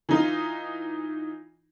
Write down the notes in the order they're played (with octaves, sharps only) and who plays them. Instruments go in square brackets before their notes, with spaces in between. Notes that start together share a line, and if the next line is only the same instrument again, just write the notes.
[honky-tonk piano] E3 D#4 F4